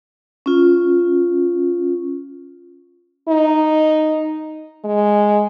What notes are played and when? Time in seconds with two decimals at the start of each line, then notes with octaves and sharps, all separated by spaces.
0.46 C#4 F4
3.29 D#4
4.85 G#3